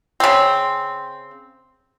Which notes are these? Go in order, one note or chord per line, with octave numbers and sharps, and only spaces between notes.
C#3 C4